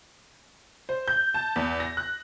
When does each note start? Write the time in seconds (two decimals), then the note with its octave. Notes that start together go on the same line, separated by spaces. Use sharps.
0.89 C5
1.08 G6
1.34 A5
1.56 E2
1.80 A#6
1.97 F#6